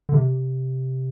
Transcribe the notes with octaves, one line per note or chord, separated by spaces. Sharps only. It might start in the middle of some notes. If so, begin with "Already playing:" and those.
D3
C3